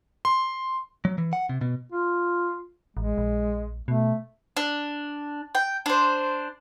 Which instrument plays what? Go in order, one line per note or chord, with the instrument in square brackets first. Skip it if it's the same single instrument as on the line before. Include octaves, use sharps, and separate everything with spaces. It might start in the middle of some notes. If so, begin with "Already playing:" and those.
[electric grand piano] C6
[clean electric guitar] F#3
E3
F#5
C3
B2
[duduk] F4
[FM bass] A1 [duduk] G#3
[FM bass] A#1
[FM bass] B2 [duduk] A3
[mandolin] D4
G5
D4 C5